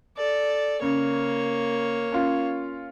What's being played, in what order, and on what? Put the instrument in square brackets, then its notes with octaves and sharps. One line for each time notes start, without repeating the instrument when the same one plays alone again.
[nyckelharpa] A4 D5
[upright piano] C#3 [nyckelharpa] A#3 C#5
[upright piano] C#4 F4